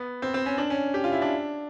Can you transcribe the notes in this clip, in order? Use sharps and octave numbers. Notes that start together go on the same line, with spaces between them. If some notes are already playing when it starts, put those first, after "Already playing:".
Already playing: B3
C4
C4
C#4
D4
C#4
G4
F4
E4
D4